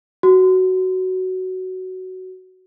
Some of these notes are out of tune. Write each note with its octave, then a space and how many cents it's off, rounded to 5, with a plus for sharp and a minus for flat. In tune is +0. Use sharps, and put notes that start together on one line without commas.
F#4 +10